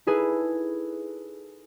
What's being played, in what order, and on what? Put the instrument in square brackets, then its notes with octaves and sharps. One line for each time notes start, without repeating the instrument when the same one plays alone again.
[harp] D#4 E4 G#4 A4 B4